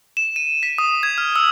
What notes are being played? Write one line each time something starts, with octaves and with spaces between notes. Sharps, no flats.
E7
D#7
B6
D#6
G#6
F6
E6